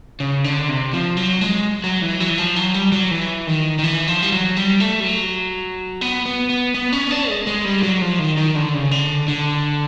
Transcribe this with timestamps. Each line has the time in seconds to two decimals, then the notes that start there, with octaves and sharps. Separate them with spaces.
0.20 C#3
0.44 D3
0.69 C3
0.93 F3
1.17 F#3
1.41 G#3
1.84 F#3
2.02 E3
2.20 F#3
2.29 E3
2.38 F3
2.56 F#3
2.74 G3
2.92 F#3
3.11 E3
3.47 D#3
3.79 D#3
3.84 E3
4.07 F3
4.23 G3
4.32 F#3
4.57 G3
4.80 A3
5.00 G3
5.04 F#3
6.01 B3
6.26 B3
6.49 B3
6.74 B3
6.92 C#4
7.11 D4
7.29 G#3
7.47 G#3
7.65 G3
7.83 F#3
8.02 F3
8.19 D#3
8.37 D#3
8.55 D3
8.74 C#3
8.91 D3
9.28 D3